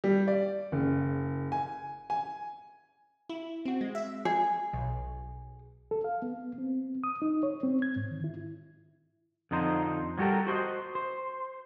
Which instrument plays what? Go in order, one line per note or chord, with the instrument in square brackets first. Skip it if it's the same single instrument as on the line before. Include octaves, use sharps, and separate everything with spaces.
[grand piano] G3
D5
F#1
G#5
G#5
[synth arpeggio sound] E4
C4 F#4
G#3
E5
[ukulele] G#4
[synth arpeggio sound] B1
[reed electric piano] A4
F5
B3
C4
D#6
D#4
C#5
C4
G#6
G#2
D#3
E4
[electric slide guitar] F2 D3 D#4 C5
F#3 G3 F#4 G4 A4 A#4
F#4 C5 D5 D#5
C5